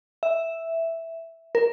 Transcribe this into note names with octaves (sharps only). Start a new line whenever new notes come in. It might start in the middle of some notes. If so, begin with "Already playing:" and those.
E5
A#4